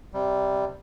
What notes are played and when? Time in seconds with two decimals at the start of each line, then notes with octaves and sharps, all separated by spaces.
0.14 C3 G3